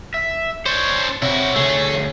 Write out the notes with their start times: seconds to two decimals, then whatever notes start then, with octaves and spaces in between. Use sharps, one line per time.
0.14 E5
0.66 D4 C5 C#5
1.22 C3 E4 F#4 C#5
1.56 D2 A3 G#4